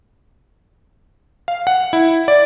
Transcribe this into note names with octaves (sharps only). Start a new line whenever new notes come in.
F5
F#5
E4
D5